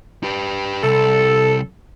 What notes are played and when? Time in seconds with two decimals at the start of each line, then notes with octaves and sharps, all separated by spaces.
0.24 G4 B4
0.83 C2 A4